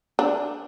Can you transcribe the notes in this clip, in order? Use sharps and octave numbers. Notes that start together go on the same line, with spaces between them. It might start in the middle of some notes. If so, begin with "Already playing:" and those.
D4